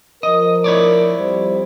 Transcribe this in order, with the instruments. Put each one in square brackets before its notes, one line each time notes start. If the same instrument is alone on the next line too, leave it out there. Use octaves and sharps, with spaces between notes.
[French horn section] F3 A#4 [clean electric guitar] D#5
[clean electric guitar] E4 C#5 D5
[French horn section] F2 G3 C5